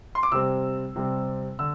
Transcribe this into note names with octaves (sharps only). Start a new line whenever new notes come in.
C6
D6
C3 G3 C4 E6
C3 G3 C4
D3 E6